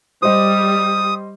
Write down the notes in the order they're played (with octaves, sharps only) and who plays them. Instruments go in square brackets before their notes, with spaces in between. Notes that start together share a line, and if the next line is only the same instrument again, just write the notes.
[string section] G3 [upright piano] C5 D#5 [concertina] D#6